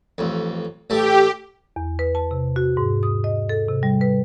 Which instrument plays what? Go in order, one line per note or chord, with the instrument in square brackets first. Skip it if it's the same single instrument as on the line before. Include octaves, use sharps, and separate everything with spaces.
[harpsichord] A1 F2
[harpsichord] A1 A3 A5 [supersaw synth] G4
[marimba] E2
B4
A5
C3
F#4
G#2
D#6
D#5
A4
C3
G3
B4